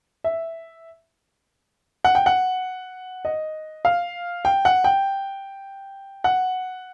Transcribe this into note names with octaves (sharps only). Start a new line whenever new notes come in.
E5
F#5
G5
F#5
D#5
F5
G5
F#5
G5
F#5